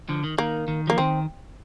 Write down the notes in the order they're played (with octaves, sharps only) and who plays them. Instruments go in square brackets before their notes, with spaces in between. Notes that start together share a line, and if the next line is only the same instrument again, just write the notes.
[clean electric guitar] D3 F3
D#3
[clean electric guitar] D#3 [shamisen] A#3
[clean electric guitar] D#3
[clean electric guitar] F3 [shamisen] A#3
[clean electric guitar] D#3 [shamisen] C4